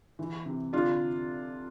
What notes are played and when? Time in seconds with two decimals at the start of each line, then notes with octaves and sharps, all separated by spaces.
0.19 E3
0.46 C3
0.73 D3 D4 F4